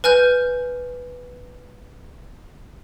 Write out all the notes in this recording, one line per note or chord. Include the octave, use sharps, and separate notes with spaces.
B4 G#5 F6 G6